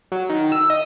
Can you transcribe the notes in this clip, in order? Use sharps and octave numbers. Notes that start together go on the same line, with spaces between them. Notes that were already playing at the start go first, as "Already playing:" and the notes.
F#3
D#3
E6
D#5